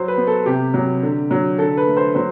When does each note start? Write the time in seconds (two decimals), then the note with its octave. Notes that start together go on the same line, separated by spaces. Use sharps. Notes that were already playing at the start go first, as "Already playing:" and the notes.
Already playing: F#3 C5
0.08 B4
0.17 B3
0.27 A4
0.46 C3 G4
0.74 F#3
1.03 D3
1.31 F#3
1.58 D3 A4
1.77 B4
1.87 A3
1.97 C5
2.15 F#3 C5